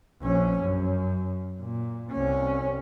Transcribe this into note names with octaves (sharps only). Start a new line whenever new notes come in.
A#1 C#4
F#2
A#2
C2 C#4